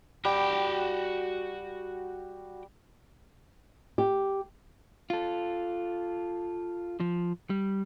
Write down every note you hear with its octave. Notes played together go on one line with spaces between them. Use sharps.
G3 F#4 G5
G4
F4 A4
F3
G3